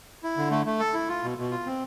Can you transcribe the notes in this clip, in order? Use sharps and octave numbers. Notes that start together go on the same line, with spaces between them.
E4
D3
A3
A3
A4
E4
F4
B2
B2
F4
C4